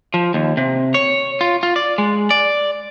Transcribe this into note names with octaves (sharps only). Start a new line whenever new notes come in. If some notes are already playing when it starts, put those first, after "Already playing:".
F3
D#2
C3
C#5
F4
F4
D5
G#3
D5